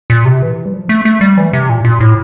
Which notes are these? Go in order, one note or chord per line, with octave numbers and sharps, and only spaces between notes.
A#2
C3
E3
G3
F3
A3
A3
G3
E3
C3
A#2
A#2
A2